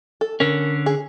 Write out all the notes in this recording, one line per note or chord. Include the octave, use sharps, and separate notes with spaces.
A4
D3 C#4 A#4
G#4